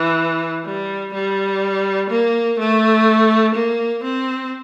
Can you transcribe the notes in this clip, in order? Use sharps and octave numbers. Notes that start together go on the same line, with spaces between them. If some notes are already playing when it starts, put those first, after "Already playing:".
Already playing: E3
G3
G3
A#3
A3
A#3
C4